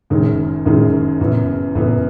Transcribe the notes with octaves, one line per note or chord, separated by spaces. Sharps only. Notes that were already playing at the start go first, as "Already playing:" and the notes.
F#1 F#2 D#3 G#3 C#4
F#1 F#2 D#3 G#3 C#4
F#1 F#2 E3 B3
F#1 F#2 E3 B3